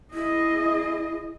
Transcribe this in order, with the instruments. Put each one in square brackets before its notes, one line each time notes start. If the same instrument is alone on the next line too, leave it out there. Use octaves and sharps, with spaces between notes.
[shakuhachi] E4 [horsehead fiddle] G#4 D#5